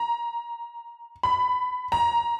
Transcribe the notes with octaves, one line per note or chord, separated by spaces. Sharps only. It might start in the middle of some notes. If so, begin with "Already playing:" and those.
Already playing: A#5
B5
A#5